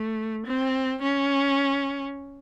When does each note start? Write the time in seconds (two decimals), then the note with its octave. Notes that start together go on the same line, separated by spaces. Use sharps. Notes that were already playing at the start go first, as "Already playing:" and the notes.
Already playing: A3
0.46 C4
1.02 C#4